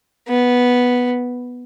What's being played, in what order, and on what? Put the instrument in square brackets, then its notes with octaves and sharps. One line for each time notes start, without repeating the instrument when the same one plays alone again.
[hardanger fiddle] B3